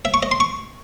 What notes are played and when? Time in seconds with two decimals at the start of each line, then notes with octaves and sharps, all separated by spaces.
0.05 E5
0.14 C#6
0.23 D#5
0.31 C6
0.40 C#6